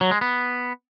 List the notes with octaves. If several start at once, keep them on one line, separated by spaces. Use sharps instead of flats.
F#3
G#3
B3